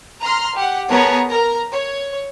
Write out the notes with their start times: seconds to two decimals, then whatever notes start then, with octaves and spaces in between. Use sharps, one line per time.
0.22 A#5 C6 F6
0.56 G4 F#5
0.90 B3 G#4 A#4 C#5 A5 A#5
1.30 A#4 A#5
1.72 C#5